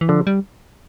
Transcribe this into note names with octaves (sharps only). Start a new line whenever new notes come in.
E3
D3 F3
G3